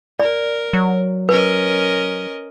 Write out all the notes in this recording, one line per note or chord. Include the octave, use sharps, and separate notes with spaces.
A#4 D5
F#3
C#4 A#4 B4 D#5